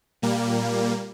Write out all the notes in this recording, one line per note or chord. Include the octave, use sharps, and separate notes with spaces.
A#2 G3 A#3